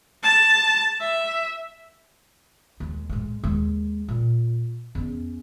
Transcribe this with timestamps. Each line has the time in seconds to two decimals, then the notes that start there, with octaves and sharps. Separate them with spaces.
0.23 A5
1.01 E5
2.80 D#2 G#3
3.10 A2 G#3
3.44 D#2 G#3
4.08 A#2
4.95 E2 C#4